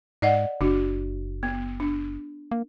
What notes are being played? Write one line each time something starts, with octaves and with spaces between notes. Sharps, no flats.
G#2 D5 D#5 F#5
F#1 D4 F#4
B3
D4
A#3